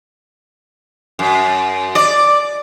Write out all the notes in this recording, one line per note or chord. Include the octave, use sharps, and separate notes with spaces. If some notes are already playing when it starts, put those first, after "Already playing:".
F#2
D5